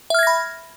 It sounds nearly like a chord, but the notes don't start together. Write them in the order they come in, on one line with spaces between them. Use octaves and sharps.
E5 F6 G#6 A#6 B5